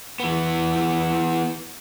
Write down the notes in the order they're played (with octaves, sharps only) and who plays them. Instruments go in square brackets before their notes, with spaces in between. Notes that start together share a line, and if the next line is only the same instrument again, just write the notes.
[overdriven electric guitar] E3 B3